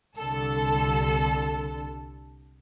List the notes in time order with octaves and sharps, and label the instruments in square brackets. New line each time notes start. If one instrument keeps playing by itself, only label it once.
[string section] C2 D3 A4